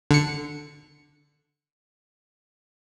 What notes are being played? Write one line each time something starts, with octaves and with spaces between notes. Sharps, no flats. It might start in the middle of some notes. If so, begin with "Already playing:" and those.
D3 C#7